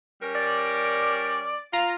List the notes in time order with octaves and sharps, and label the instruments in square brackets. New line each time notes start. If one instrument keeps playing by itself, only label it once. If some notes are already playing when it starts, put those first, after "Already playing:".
[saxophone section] G3 C#4 A#4
[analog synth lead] D5
[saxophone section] F4 [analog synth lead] A#5